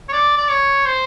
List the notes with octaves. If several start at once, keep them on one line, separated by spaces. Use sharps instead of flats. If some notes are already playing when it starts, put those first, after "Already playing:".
C#5
D5
D5
C#5
C5